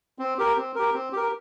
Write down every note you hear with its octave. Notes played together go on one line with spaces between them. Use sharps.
C4
G4 A#4
C4
G4 A#4
C4
G4 A#4